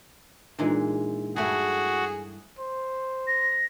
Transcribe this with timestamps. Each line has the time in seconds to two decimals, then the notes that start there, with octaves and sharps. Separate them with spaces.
0.59 A#2 E3 G#3 D4 D#4 F4
1.36 G2 A3 E4 F#4 G#4
2.59 C5
3.27 A#6